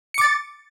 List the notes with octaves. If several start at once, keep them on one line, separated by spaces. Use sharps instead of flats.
D6 A6 C#7